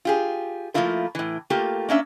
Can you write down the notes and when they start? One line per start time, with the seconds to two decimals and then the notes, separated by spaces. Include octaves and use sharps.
0.05 F4 G4 G#4
0.74 F3 A3 A#3 E4 F4 A#4
1.15 A2 E3
1.50 A3 A#3 F4 G4
1.89 A#3 C#4 D4 E5